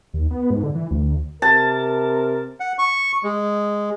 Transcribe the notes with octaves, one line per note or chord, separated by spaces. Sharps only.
D#2
B3
G#2
D3
E3
D2
D2
C3 A#4 A5
F#5
C#6
G#3